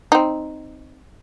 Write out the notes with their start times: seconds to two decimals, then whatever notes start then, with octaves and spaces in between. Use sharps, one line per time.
0.12 C4 D#4